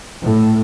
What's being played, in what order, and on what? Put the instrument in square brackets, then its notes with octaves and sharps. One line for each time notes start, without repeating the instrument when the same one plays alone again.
[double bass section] A2